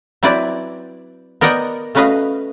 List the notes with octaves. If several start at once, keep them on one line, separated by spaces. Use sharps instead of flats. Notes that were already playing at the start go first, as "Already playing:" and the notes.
F#3 C4 E4 B4 D5
B3 A#4 D5 D#5 F#5 G5
A3 C#4 F#4 B4 D#5 F5